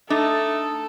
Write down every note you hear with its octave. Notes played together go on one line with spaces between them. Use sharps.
A3 D4 D#4 A4